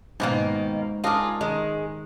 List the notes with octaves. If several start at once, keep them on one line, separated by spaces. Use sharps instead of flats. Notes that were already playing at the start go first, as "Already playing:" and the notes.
G#2 B2 D#3 A#3
D4 F4 G#4 A#4 D#5
D#3 G#3